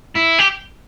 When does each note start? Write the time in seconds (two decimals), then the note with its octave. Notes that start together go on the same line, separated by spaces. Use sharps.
0.15 E4
0.38 G4